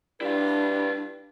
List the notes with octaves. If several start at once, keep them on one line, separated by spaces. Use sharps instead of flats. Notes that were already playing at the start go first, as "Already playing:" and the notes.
G3 D4 E4 B4 F5